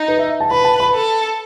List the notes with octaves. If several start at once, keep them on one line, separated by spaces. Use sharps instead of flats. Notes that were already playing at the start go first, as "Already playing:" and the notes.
Already playing: D#4
B4
E5
A5
B4 B5
A5
B5
A4